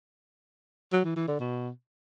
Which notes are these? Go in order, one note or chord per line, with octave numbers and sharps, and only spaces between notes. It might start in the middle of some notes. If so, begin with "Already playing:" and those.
F#3
E3
E3
D3
B2